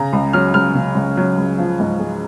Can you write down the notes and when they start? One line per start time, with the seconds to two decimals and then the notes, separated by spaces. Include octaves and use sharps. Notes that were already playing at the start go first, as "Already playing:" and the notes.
Already playing: C#3 A#5
0.13 C#2
0.33 F#3 F6
0.54 C#2 F6
0.75 C#3
0.95 C#2
1.17 F#3
1.38 C#2
1.58 F3
1.80 G#2
2.00 G#3